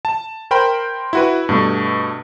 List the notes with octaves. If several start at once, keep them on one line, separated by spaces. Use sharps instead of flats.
A5
A#4 C5 G5 B5 C6
E4 F#4 B4
G2 B2 A3